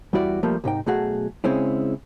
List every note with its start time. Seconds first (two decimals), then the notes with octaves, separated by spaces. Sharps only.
0.13 E2 G3 E4 F#4 D5
0.43 F3 G3 A3 A#3
0.64 C2 G#2 D#4 G5
0.86 B1 B2 A3 F#4 G#4 F#5
1.44 C#3 G#3 C4 C#4 E4